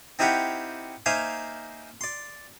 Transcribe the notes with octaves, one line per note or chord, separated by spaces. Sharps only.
C4 D#4 E4 G4 F5 F#5
A#3 D#4 C5 E5 F5 G#5
D5 C6